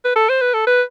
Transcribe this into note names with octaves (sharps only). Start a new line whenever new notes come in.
B4
A4
C5
B4
A4
B4